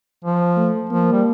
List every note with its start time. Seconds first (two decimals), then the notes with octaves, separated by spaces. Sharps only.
0.25 F3
0.57 A3
0.89 F3 A#3
1.12 G3